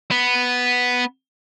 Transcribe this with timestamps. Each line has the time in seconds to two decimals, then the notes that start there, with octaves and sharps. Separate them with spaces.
0.11 B3